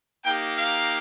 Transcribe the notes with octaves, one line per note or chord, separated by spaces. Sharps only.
A#3 D#4 G4 G5
F5